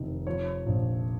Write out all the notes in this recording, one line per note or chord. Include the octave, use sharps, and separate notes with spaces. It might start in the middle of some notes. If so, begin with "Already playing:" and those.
Already playing: F1 D#3
F3 C#5
A#1